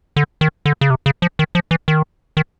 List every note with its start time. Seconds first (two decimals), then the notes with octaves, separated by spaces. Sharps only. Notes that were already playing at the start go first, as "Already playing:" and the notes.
0.16 D3
0.41 D#3
0.66 D3
0.81 C#3
0.90 C3
1.06 C#3
1.22 F3
1.39 D#3
1.55 F3
1.71 E3
1.88 D#3
2.37 D#3